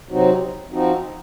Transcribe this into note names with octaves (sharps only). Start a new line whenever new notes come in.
C3 F#3 C4 D#4 F#4
F3 C4 D#4 F#4